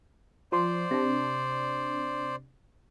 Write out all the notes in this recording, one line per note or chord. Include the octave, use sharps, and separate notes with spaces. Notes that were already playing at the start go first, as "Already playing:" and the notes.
F3 C5 D5 C6
C3 D4